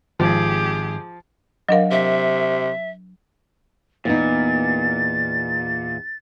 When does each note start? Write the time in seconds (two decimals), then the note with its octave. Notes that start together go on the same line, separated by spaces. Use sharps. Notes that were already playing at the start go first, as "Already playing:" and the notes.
0.20 G#1 F3 G4 G#4
1.69 F#3 D4 A#4 D#5 F5
1.91 C3 E5
4.05 E2 A#2 B3 D#4 A6